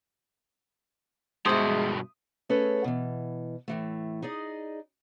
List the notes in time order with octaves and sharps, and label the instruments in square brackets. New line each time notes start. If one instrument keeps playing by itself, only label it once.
[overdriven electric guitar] G2 B2 [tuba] G#3 [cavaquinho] C5 E5 [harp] D#6
[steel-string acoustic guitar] A3 C#4 G#4 A4 B4 C#5
B2 E3
A2 E3 A3
D#4 G#4 D5 D#5